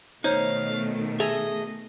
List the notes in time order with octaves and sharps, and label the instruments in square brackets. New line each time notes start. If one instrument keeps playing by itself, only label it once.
[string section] B2 D#3 A3 [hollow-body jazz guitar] D#4 [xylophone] C5 C#5 G6 [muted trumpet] F5
[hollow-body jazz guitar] G#4 A4 E5 [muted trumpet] D#5 [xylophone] F7